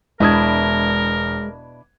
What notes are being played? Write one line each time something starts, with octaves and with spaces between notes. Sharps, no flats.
E1 B2 G#3 D4 E4 A#4 D#6 G#6